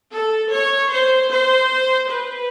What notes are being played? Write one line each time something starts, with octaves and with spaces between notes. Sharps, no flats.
A4
C#5
C5
C5
B4